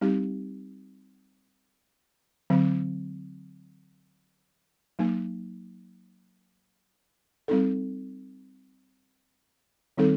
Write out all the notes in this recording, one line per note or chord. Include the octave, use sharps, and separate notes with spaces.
G3 C4 D#4 G4
D3 F#3 C4
F#3 A#3 D#4
G3 C4 D#4 A4
D#3 G3 C4 D#4 A4